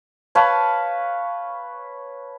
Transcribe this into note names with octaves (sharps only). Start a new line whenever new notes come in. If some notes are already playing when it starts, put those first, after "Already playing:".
B4 C#5 F5 A5